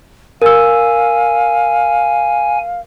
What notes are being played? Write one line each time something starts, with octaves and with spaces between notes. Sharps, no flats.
A#4 F5 G#5 E6